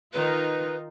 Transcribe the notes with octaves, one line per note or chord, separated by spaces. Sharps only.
D#3 D#4 F4 B4